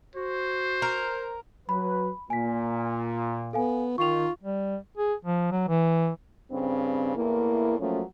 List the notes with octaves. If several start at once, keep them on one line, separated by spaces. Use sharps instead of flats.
F#4 C5
A#4
F#3 B4 B5
A#2 G#5 B6
B3 A4 F5 G#5
D#3 F4 C#6 F7
G3
G#4
F3
F#3
E3
G2 C#3 C4
E2 A2 E3 A#3
F3 F#3 A3 A#3 C#4